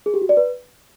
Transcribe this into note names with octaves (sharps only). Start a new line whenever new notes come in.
G#4
G4
F#4
D5
B4